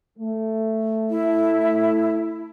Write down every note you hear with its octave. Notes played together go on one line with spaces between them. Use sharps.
A3
E4